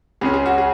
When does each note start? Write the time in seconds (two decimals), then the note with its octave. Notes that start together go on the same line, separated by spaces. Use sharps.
0.21 C#2 C#3 G#3 C#4 G#4
0.34 G#4
0.46 F#4
0.58 G#4